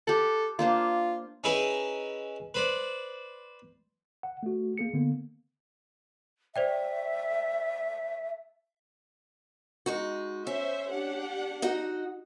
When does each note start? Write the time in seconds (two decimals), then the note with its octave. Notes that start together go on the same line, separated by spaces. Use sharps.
0.07 G4 A4 F#5
0.59 A#3 D4 F4 C5
1.44 C#4 D#4 E4 G#4 B4 C#5
2.54 B4 C5 D5
4.23 F#5
4.43 A3 F#4
4.78 A#3 G#4 C#7
4.93 D3 A#3 B3
6.56 C5 D5 E5 G5
9.86 G#3 D#4 F#4
10.47 C#4 C5 E5
10.91 D4 G4 F#5
11.62 D#4 F#4 D#5